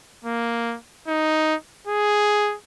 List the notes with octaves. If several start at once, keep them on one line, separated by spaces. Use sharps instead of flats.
A#3
D#4
G#4